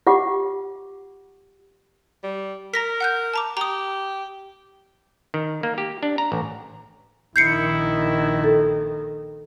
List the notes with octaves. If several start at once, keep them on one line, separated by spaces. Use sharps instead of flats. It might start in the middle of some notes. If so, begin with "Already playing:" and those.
F4 G4 F#5 D6
G3
A#4 A#5 A#6 B6
F#5 F#6 G6
A5 A#5 D6
G4 A#5 D#6
D#3
A#3
G4
D4
A#5
A1
A#1 D#3 E4 G6 C7 C#7
A4